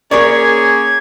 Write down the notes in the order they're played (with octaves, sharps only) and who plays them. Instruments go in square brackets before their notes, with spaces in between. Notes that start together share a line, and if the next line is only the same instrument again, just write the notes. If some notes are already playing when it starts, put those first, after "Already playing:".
[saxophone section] A#3 C#4 G#4 [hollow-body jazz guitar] A#4 C#5 D5 [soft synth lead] G#6